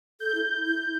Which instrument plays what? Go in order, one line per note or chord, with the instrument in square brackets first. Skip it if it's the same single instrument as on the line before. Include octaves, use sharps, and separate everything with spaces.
[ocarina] A4 [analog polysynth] G6
[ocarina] E4
E4